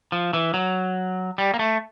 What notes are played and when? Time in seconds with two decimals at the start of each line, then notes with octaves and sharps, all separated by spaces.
0.12 F3
0.33 E3
0.54 F#3
1.38 G3
1.54 A#3
1.59 A3